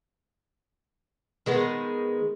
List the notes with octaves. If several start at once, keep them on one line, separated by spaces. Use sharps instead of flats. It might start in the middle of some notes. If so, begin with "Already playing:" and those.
D#3 G#3 B3